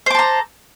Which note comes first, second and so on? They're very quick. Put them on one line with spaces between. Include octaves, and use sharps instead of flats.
C5 D6 A4 A#5